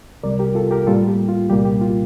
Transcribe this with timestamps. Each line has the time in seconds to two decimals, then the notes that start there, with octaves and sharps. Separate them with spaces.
0.23 C2 C3 G3 A#4 D5
0.39 G4 A#4
0.55 F4 A4
0.71 G4 A#4
0.87 A2 G3 A#3 F4 A4
1.08 G4
1.28 F4
1.49 C2 A#2 G3 A#3 G4
1.65 G4
1.81 F4